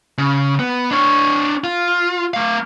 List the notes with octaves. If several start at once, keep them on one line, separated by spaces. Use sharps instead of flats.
C#3
B3
D4 C#5
F4
A3 F5